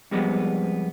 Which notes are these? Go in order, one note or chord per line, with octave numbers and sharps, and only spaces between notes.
F2 G3 G#3 B3